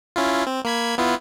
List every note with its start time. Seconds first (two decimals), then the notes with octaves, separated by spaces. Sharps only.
0.16 C#4 E4 F4
0.47 C4
0.65 A#3 B5 G#6
0.98 B3 E4 F4